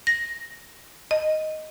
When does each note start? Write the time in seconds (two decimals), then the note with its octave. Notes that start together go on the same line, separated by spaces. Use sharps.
0.07 A#6
1.11 D#5